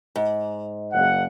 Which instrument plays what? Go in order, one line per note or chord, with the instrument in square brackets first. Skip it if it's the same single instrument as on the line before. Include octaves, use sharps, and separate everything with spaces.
[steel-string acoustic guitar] G#2
[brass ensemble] F#1 F#5